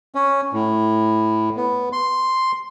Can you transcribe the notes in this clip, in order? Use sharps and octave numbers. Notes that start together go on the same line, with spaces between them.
C#4
A2
B3
C6